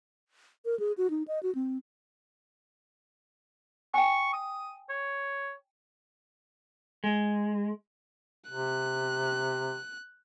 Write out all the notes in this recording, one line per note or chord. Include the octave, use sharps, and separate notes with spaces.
A#4
G#4
F#4
D#4
D#5
F#4
C4
G5 G#5 C#6
D#6
C#5
G#3
C3 F#6